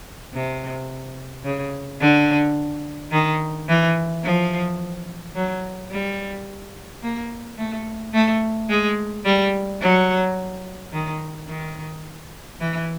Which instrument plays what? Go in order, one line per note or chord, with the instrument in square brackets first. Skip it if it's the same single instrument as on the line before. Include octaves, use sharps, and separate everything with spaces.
[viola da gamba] C3
C#3
D3
D#3
E3
F3
F#3
G3
A#3
A3
A3
G#3
G3
F#3
D#3
D#3
E3